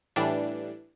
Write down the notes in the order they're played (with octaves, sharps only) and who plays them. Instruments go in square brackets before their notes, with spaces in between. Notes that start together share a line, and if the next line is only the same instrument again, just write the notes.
[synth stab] A2 E3 G3 D4